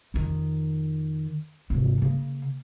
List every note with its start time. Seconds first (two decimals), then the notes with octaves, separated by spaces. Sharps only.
0.14 F2 D#3
1.70 G#1 C3
2.02 C#3 A#3